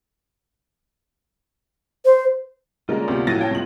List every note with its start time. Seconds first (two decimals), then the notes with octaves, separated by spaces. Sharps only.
2.05 C5
2.89 D3 G3 G#3 A#3 C#4 F4 D5 A#5
3.08 D2 C3 A#3 B3 G4
3.27 A2 F3 F#3 A6 A#6 D#7
3.39 C#5 F5 G5 A5
3.51 C#2 G3 B3 C4 F4 G#4 F#7